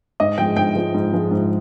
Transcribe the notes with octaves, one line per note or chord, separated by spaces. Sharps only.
G#2 D#5
F3 G#3 G5
G#2 G5
F3 G#3
G#2
F3 G#3
G#2